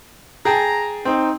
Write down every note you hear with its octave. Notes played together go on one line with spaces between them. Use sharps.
G#4 G5 A5 A#5
C4 D#4